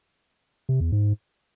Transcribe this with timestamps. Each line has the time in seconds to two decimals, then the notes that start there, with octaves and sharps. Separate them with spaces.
0.69 C3
0.80 E2
0.92 G#2